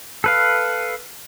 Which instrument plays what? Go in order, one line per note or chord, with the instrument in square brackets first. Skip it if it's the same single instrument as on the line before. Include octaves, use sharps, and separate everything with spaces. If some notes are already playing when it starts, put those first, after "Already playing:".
[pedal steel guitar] A4 B4 F5